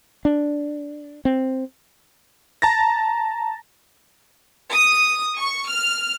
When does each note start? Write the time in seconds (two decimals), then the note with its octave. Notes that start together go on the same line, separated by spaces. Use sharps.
0.25 D4
1.25 C4
2.62 A5 A#5 A6 A#6
4.73 D#6
5.37 C#6
5.69 F6